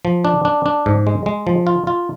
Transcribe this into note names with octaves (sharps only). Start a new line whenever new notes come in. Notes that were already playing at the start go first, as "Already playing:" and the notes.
F3
D4
D4
D4
G#2
G#3
G#3
F3
F4
F4